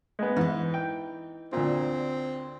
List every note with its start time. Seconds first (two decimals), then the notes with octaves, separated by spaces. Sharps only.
0.19 G#3 B3
0.37 G#2 E3 D#4
0.74 G5
1.53 D2 A#2 C4